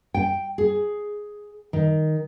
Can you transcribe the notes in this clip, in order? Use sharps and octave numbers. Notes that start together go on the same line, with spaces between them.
G5
G#4
D#3